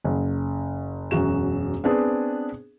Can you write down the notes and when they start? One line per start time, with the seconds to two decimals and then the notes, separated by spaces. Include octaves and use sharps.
0.04 F#1
1.11 E1 F#2 F#4 E7
1.84 B3 C4 D4 G#4